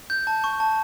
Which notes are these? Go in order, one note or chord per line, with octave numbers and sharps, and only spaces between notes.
G6
A5
C#6
A5